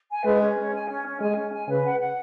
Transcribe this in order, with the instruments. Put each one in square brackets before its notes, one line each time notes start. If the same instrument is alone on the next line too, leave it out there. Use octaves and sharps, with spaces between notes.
[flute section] G#5
[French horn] G#3 [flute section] B4
[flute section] C#4
C#4
G#5
C#4
C#4
[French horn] G#3 [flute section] G#5
[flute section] C#4
G#5
[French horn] C#3 [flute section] B4
[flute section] F#5
F#5